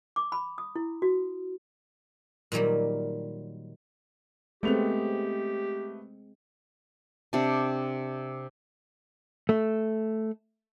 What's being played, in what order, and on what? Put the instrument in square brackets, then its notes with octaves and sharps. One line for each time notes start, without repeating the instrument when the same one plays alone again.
[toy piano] D6
B5
D#6
E4
F#4
[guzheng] A#2 D#3 F#3 G3 A#3
[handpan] G#3 C4 [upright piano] A3 B3 F7 [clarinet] G4
[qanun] C3 D4
[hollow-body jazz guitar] A3